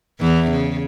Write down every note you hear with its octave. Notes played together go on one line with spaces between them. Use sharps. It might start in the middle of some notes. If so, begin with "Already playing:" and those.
E2 E3
C#3